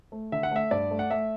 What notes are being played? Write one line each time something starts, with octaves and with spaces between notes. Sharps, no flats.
A3
D3 E5
F#5
A3 E5
G2 D5
A3
F#5
A3 E5